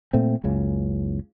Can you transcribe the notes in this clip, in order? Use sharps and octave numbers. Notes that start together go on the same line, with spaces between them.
A#2 A3 C4
F#1 C#2 C#3